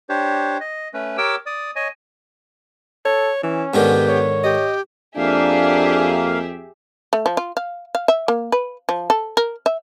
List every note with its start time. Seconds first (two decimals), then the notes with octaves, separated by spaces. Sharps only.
0.09 D4 G4 C5 C#5
0.60 D#5
0.94 A3 C#4 B4
1.18 G4 A#4 C#5 G5 D6 E6
1.46 D5 D#6
1.76 C#5 D#5 G#5
3.05 A4 C#5
3.43 E3 C#4
3.74 G#2 D3 D#3 B3 G4
4.08 C#5
4.44 G4 D#5
5.17 F2 A#3 D4 G4 G#4 E5 F5
7.13 A3
7.26 F3
7.37 F4
7.57 F5
7.95 F5
8.08 E5
8.28 A#3
8.52 B4
8.89 F3
9.10 A4
9.37 A#4
9.66 E5